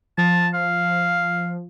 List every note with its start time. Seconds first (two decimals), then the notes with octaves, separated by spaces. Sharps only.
0.18 F3 A5
0.54 F5